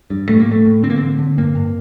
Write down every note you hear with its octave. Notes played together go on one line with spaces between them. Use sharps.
G2
A2 A3
A#3
A2
A3
A2
D3 C4
A#3
D3 C4
D3
G2 A#3
G2